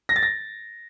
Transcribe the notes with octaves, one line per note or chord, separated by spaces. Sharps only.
A#6
A6
A#6